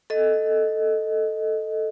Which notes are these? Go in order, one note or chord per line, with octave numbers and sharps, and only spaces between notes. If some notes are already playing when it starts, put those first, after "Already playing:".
A4 D#5